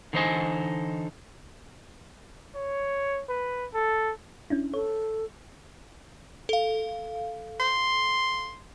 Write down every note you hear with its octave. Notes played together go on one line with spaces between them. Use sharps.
D3 E3 D#4 C5 D#5 G#5
C#5
B4
A4
C#4 D4 E4
A4 C#5
A4 F5
C6